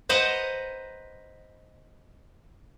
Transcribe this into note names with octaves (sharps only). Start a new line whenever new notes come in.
B4 C5 D#5 F#5 A#5